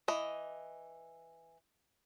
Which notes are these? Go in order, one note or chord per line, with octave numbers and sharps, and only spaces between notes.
E3 D#5